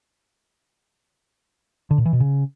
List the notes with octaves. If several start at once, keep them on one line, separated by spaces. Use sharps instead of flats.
D3
A#2
E3
B2
C#3